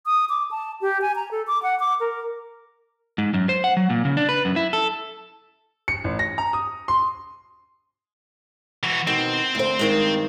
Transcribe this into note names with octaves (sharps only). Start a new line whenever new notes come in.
D#6
D6
A5
G4
G#5
A#5
A4
D6
F#5
D6
A#4
G#2
F#2
C5
F#5
F#3
A#2
C#3
D4
B4
F#2
E4
A4
C#7
A1
A#6
A#5
D#6
C6
E3 F#4
B2 D#3 C4
D2 C5
G2 D#3 G#3